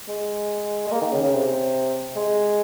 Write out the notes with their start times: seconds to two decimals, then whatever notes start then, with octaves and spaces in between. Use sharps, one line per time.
0.08 G#3
0.87 G#3
0.92 A#3
1.02 D#3
1.12 C#3
1.23 C#3
1.33 C3
2.16 G#3